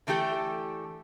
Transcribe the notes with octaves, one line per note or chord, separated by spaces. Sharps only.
D3 E3 A3 G4 A4